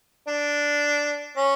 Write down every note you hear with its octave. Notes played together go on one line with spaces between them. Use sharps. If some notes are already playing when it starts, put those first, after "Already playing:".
D4
C#4